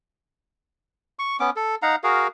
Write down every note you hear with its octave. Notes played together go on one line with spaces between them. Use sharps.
C#6
B3 C#4 D6
A4
D#4 F5 F#5 A#5
F#4 G#4 A#4 F5